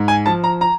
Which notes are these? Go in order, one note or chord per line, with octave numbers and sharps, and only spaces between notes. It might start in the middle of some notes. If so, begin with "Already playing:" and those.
Already playing: G#2
G#5
F3 A5
A#5
A#5